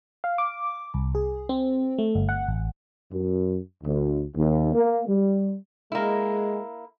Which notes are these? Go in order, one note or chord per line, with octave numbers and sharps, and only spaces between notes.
F5
D6
C2
G#4
C4
A3
G1
F#5
A1
F#2
D2
D#2
A#3
G3
G#3 A#3 E4